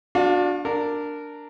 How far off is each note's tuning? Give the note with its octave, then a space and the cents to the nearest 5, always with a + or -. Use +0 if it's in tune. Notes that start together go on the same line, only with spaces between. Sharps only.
D4 +5 F#4 -35 F5 +25
D4 +0 A#4 -10